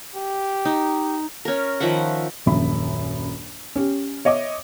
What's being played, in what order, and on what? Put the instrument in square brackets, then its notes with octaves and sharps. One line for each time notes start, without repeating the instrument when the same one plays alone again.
[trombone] G4
[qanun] D#4
C#4 A#4
D#3 F3 E5 F#5
[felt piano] D#1 A#1 F#2 E5 B5
C#4 G4
C#5 D#5 E5 D6